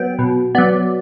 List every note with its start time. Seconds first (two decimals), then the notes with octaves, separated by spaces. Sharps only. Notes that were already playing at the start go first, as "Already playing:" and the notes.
Already playing: F#3 B3 G5
0.19 B2
0.55 F#3 B3 D5